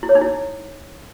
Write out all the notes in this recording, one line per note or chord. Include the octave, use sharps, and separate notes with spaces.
E4
C#5
D#4
E4